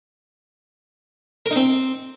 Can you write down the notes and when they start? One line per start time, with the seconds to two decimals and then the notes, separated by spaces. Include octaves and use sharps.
1.46 A#4
1.51 D#4
1.56 C4